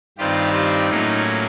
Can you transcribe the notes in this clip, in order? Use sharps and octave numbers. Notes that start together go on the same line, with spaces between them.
G2 D#3 G3 C4 F4 G4
F4 G4
A2 F#3 A#3 C#4 D#4 F4